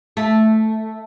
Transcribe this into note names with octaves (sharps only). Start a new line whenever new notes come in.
A3